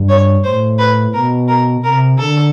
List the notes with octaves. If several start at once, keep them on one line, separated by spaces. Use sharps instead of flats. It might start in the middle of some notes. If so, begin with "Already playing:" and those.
Already playing: G2
C#5
A2 C5
B4
B2 A#4
A#4
C3 A#4
D3 A4